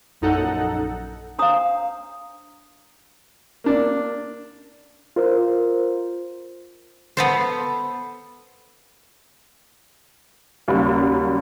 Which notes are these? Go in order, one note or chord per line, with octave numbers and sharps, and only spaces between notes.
A#1 F#2 D#4 A4 F#5
D4 C5 F5 A#5 D#6
A#3 D4
F4 A#4 C5
B3 A4 C5
D#2 C#3 F#3 G3